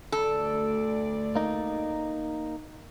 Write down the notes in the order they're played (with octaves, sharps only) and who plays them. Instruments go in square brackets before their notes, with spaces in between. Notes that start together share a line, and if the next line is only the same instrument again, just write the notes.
[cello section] D2 D5 [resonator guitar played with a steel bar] A4
[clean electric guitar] A#3 D#4